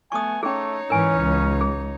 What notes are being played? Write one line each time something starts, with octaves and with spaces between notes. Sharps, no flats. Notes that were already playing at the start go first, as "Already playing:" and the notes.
A3 B3 G#5 C#6 D#6
A3 C#4 D#4 G#4 C#5
G#2 E3 C#4 A#4 G#5
C#2
G#4